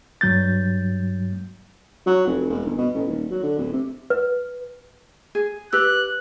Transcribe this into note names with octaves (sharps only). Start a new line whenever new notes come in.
G2 F#3 G6 A6
F#3
F1
E1
G1
B2
A1
D#1
F#3
D3
D1
C3
B4
G#4
G4 B4 D5 E6 F#6